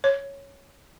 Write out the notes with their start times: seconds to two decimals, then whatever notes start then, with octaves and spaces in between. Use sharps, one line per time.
0.04 C#5